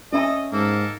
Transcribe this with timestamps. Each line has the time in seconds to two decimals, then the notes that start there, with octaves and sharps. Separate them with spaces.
0.12 C#4 A4 D#5 E5 G#5
0.53 G#2 A#3 A4